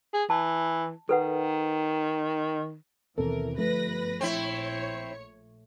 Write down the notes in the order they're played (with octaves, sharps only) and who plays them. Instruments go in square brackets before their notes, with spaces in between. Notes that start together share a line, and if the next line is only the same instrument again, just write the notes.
[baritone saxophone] G#4
[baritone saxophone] E3 [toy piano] A5
[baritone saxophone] D#3 [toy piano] A4 B4 F#5
[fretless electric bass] D#2 B2 C4 [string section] E3 A#4 [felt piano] A4
[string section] G1 B4 A#6 [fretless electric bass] F3 [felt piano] A3
[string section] A#1 C#5 C#7 [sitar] C4 E4